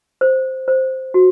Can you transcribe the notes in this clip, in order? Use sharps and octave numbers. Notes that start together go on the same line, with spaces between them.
C5
C5
F#4